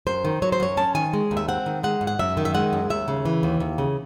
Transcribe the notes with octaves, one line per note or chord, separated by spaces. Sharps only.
F#2 C5
D#3
F#3 C#5
C5
F#2 C#5
C#4 A5
D#3 G#5
G#3
D#2
E5
C4 F#5
D#3
G#3 F#5
G#2
F#5
F#2 E5
D#3
E5
G#3 F#5
F#2
D#2 E5
C#3
E3
D#2
D#2
C#3